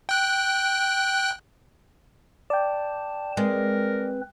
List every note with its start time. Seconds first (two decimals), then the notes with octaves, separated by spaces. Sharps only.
0.09 G5 F#6
2.50 D5 G5 A5
3.37 G#3 C4 A#4 B4